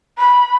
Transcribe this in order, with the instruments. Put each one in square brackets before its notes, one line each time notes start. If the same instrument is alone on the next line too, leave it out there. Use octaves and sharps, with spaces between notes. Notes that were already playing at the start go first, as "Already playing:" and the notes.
[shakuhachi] B5